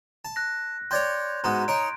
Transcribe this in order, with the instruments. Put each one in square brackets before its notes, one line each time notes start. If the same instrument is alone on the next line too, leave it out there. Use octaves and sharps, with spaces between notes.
[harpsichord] A5
[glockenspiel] F#6 A#6
[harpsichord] C#5 D5 G5 [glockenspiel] C6 G6 G#6
[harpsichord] G#2 B3 F#4 [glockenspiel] A#5 C6
[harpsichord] D#4 C#5 C#6 [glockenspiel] D7